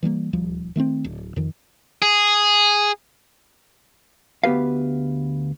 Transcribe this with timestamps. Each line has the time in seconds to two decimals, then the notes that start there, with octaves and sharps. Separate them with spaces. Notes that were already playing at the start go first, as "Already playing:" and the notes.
0.03 E3 G3 G#3 A#3
0.33 D#1 D2 F3 G3
0.76 D#3 A3 A#3 C4
1.04 D1
1.36 F2 D#3
2.02 G#4
4.44 D2 B3 G4 B4 F5